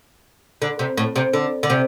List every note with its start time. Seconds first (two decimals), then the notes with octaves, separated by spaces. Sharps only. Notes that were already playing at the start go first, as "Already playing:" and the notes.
0.62 D3
0.79 C3
0.97 A2
1.16 C3
1.33 D3
1.63 D3
1.70 C3